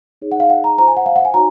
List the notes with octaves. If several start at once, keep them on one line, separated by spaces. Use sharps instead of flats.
D#4 G#4 C#5
F#5
F5
F#5
A#5
F4 C5 A#5
G#5
F#5
F5
F#5
G#5
D#4 F#4 C#5 A#5